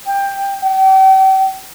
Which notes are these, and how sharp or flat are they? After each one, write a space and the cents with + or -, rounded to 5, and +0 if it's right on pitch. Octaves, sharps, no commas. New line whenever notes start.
G5 +15
G5 -40